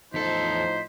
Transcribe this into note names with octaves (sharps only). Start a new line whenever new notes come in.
E2 A2 F3 D#4 A4 C5 B6